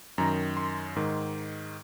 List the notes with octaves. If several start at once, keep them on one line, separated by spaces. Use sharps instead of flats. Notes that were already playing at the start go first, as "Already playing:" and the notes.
F#2 D#3 A#5
C6
G#2 D#3